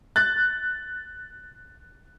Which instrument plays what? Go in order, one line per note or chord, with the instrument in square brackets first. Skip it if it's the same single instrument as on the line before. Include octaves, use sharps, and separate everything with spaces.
[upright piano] F#6 A6